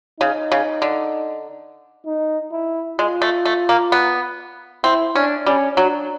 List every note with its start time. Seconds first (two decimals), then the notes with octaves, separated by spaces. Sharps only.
0.20 C#3 D#4
0.52 C#3
0.82 D3
2.06 D#4
2.52 E4
2.98 G#3 F4
3.22 A3
3.45 A3
3.69 A#3
3.92 B3
4.84 C4 E4
5.15 C#4 D4
5.46 G3 C#4
5.77 F#3 D4